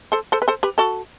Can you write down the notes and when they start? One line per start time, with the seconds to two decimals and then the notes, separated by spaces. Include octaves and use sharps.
0.12 A4 C5
0.32 A4 C5
0.42 B4
0.48 A4 C5
0.63 G4 B4
0.78 F#4 A4